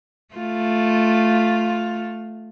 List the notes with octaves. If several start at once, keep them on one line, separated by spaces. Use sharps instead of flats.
A3 F4